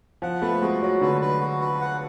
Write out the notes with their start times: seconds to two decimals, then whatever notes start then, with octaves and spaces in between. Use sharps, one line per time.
0.22 F3 F#5
0.42 A3 B4
0.62 G#3 F#4
0.82 F#3 F#4
1.01 D3 B4
1.21 B4
1.41 F#4
1.61 B4
1.81 F#5